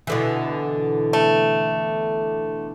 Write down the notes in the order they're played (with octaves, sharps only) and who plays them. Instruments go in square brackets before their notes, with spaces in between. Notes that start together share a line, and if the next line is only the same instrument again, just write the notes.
[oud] B2 D3 E3
[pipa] A3